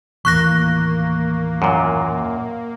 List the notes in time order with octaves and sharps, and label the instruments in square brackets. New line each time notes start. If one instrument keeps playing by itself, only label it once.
[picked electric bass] D#2 A2 E3 [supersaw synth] A#3 [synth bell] C#6 F#6 A#6
[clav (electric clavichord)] F#2 A#2